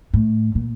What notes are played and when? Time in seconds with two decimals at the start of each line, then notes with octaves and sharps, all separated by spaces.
0.14 A2
0.55 A#2